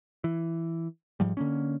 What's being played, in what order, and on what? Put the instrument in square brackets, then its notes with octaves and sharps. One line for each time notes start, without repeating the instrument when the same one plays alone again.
[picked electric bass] E3
G#2 F3 G3
D3 A#3 C#4